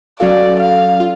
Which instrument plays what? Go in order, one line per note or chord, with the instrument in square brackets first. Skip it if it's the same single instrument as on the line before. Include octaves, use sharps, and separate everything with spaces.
[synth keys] F#3 C#4 F#4 A4 F5 [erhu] D5
[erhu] F5
[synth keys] F4